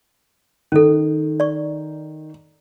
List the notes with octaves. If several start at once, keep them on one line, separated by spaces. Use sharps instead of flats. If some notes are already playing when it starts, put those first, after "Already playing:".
D#3 C#4 A4
D5 C#6